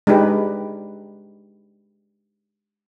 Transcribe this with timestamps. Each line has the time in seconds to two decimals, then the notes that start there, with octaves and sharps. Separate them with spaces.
0.07 G#3 D4 D#4 G4 B4